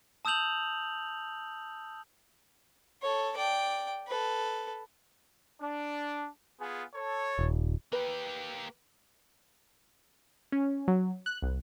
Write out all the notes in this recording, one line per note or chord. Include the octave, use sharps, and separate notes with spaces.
A5 D#6 E6 G6 F7 F#7
A4 C#5
D5 G5
A4 B4
D4
B3 F4 G#4
A4 C#5
D#1
A#3 G4 B4
C#4
F#3
F#6
C2